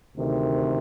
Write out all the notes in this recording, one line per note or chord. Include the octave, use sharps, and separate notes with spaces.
D2 C3 D#3